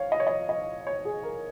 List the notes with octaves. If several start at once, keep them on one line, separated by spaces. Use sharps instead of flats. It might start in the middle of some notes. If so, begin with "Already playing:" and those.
Already playing: C#5 F5
D#5
C#5
D#5
D#5
C#5
G#4
A#4